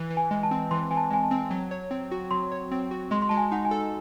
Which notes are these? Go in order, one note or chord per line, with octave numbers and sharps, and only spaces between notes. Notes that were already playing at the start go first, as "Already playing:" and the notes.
Already playing: E3
E3
G#5
G#3
A5
C4
E3 C6
E3 G#5
A5
G#3 G#5
A5
C4
F#3
C#5
C4
F#4
F#3 C6
C#5
C4
F#4
G#3 C6
C6
G#3 A5
G#5
D#4 F#5
G#5
A4